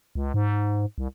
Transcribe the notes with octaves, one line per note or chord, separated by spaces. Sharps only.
C#2
G#2
C2